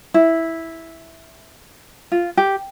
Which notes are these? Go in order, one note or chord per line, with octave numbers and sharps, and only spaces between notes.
E4
F4
G4